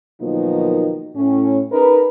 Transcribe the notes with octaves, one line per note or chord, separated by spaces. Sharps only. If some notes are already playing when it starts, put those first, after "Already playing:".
B2 D#3 F3 F#3 A#3 D#4
A2 C#4
D#4 G#4 A#4 B4